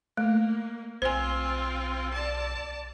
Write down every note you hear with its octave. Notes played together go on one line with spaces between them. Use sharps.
A3 A#3
B1 C4 F4 C5 G#5
D5 A5